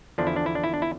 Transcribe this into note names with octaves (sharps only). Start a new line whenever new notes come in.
E2 D3 F3 D4
E4
D4
E4
D4
E4
D4
E4